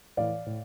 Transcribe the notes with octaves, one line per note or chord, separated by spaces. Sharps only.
A2 E3 D5 F5
A2